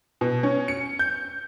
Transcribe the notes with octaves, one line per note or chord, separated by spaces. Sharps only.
B2
C#4
C#7
G6